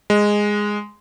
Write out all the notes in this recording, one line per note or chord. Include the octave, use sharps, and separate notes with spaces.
G#3